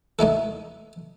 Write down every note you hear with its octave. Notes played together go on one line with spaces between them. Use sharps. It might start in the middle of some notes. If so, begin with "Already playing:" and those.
A3 D#4 E4 A4